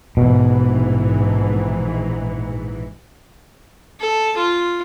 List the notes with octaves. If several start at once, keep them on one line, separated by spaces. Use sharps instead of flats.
A#1 G#2 B2 E3
A4
F4